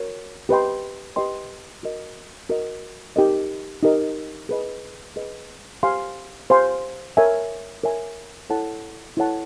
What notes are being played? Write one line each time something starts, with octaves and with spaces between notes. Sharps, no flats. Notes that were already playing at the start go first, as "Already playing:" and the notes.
Already playing: F#4 A#4 C#5
G4 B4 D#5 G5 C6
G4 B4 D#5 G5 C6
F#4 A#4 D#5
F#4 A#4 D#5
D#4 G4 A#4 D#5
D#4 G4 A#4 D#5
G#4 B4 D#5
G#4 B4 D#5
G4 C5 F5 G#5 C6
G4 C5 F5 G#5 C6
A#4 C#5 E5 G#5
A#4 C#5 E5 G#5
E4 A4 C#5 F#5 A5
E4 A4 C#5 F#5 A5